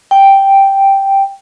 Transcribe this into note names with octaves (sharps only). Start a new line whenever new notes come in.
G5